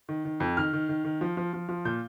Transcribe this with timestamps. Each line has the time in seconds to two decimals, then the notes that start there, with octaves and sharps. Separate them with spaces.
0.09 D#3
0.25 D#3
0.40 F2
0.57 D#3 F6
0.73 D#3
0.89 D#3
1.04 D#3
1.21 F3
1.37 F3
1.53 F3
1.69 F3
1.85 A#2 G6